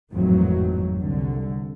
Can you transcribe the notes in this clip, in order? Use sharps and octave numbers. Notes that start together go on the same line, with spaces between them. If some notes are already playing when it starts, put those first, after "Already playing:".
G#1 F2 A2 D#3 E3 F#3
C2 D3